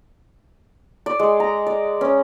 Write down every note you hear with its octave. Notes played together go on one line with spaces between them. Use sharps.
D5
G#3
A#5
D5
C#4